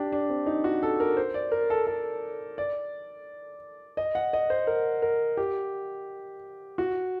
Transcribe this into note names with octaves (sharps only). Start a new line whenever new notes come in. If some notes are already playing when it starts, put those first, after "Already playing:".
Already playing: D4 G4
D4
C4
D#4
F#4
A4
A#4
C5
D5
A#4
A4
A4
D5
D#5
F#5
D#5
C5
A#4
A#4
G4
F#4